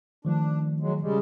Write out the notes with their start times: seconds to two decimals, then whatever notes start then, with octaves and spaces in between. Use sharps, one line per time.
0.25 D#3 F3 A3 D4
0.80 F#3 G#3
1.01 C#3 G3 G#3